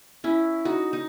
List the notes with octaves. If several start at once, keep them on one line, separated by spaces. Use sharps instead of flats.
C#4 E4
D#4 F#4
D#4